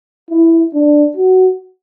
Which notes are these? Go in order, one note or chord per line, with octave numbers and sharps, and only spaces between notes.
E4
D4
F#4